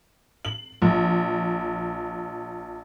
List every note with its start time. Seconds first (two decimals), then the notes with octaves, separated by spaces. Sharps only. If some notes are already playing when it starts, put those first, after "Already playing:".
0.45 F#7
0.82 A#1